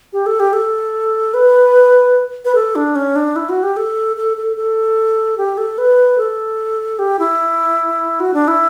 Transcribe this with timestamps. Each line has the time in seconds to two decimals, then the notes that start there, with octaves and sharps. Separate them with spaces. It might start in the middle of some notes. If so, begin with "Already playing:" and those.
0.13 G4
0.26 A4
0.40 G4
0.53 A4
1.34 B4
2.45 B4
2.55 A4
2.75 D4
2.96 C#4
3.16 D4
3.36 E4
3.49 F#4
3.63 G4
3.77 A4
4.16 A4
4.37 A4
4.57 A4
5.38 G4
5.58 A4
5.78 B4
6.18 A4
6.99 G4
7.19 E4
8.20 F#4
8.34 D4
8.48 E4